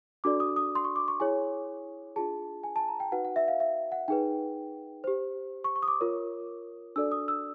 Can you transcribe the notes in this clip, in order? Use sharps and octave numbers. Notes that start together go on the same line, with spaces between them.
D4 F#4 A4 D5 D6
D#6
D#6
C6
C#6
D6
C#6
E4 G#4 C#5 G#5
D4 F4 G#4 A5
G#5
A5
A#5
G5
D#4 F#4 B4 F#5
F#5
E5
F5
E5
F#5
D#4 G#4 B4 G5
G4 C5
C#6
C#6
D#6
D6
F4 A#4 C#5
D4 F#4 A4 D5 E6
D#6
E6